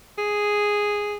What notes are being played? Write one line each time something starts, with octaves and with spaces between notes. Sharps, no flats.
G#4